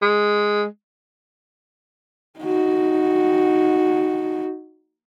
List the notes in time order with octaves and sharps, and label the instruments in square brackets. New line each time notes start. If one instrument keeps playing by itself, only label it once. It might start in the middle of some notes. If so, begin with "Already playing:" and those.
[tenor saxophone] G#3
[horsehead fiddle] D#4 F#4